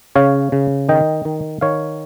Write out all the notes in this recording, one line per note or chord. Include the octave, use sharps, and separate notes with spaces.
C#3 C#5 F5
C#3
D#3 D#5 G5
D#3
D#3 C#5 F5